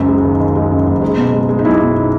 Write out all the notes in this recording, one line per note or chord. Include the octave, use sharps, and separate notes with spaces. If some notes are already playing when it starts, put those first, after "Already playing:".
Already playing: F#1 C#2 F#2
G#3
D#3
D#3
G#3
F#2
F#1
G#3
B2
G#3
G#3
D#4
B1 E4
B1